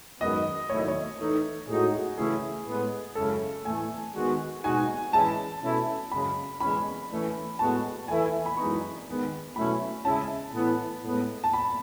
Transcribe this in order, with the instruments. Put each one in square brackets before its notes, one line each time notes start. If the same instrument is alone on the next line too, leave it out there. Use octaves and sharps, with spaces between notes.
[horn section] F#2 D#3 G#3 B3 [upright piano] D#5
[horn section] D#3 F#3 A3 E4 [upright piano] C#5
[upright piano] D#5
C#5
[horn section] E3 A3 D#4
[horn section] A2 G#3 D#4 F#4 [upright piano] G#4
[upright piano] F#4
[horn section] C#3 E3 A3 C#4 E4 [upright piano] G#4
[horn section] A2 G#3 B3
[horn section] F#2 C#3 G#3 C#4 E4 [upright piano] A4
[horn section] A2 E3 A3 [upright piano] G#5
[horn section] D#3 G#3 B3 F#4
[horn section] B2 G#3 D#4 F#4 [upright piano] G#5
[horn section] E3 G#3 C#4 E4 [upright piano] A5
[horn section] B2 A3 C#4 E4
[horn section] F#2 C#3 G#3 [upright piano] B5
[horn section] E3 G#3 C#4 [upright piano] B5
[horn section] E3 A3 C#4
[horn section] A2 G#3 B3 F#4 [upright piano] A5
[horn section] E3 A3 E4 [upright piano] G#5
[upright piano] B5
[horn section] F#2 E3 G#3 B3 D#4 [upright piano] C#6
[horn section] D#3 G#3 B3
[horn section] B2 F#3 A3 C#4 E4 [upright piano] B5
[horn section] C#3 G#3 C#4 E4 [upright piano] A5
[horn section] A2 E3 B3
A2 G#3 B3
[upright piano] A5
B5